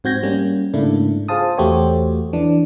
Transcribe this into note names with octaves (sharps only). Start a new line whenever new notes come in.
G#2 C4 F#4 G6 G#6 A#6
G3 A#3 C#4
G#2 C#3 A3 A#3 D4 E4
F4 G#4 C5 F5 A5 D#6
E2 A3 F#4 G4 C5 C#5
E3 D4